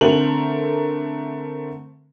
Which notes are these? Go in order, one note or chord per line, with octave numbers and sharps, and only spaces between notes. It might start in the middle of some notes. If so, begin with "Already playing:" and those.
D3 A3 C4 A#4 F7 F#7